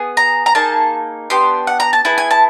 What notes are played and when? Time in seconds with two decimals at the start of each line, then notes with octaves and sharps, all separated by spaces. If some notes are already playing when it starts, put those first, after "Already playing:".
Already playing: B3 G#4
0.17 A#5
0.46 A#5
0.55 A#3 D#4 G#4 A5
1.30 B3 D4 G4 C6
1.67 F#5
1.80 A#5
1.93 A5
2.05 B3 E4 G#4 A5
2.18 G#5
2.31 A5